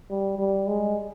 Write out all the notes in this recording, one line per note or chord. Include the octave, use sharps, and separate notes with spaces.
G3
G3
G#3